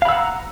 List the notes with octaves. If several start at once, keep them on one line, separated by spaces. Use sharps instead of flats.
F5 F#5 A#5 B5 E6